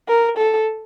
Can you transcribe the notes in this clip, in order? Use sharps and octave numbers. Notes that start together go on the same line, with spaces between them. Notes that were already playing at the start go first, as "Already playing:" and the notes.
A#4
A4